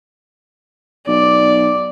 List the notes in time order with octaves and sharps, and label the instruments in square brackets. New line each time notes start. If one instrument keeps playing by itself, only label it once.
[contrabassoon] B1 [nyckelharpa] D5